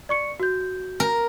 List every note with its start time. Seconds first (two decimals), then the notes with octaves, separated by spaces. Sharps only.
0.09 D5 C#6 C#7
0.40 F#4 G6
1.00 A#4